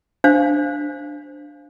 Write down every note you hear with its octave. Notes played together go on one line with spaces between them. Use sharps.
D4 C5 F5